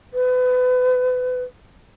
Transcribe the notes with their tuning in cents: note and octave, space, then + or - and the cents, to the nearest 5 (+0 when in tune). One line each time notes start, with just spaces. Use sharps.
B4 +30